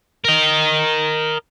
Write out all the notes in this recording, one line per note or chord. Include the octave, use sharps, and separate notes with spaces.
A#4 D#5